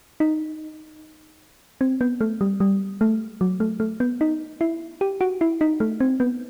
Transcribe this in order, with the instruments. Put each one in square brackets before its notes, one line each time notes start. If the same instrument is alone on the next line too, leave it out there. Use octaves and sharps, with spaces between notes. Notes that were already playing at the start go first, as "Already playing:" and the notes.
[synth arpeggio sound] D#4
C4
B3
A3
G3
G3
A3
F#3
A3
A3
B3
D#4
E4
G4
F#4
E4
D#4
A3
C4
B3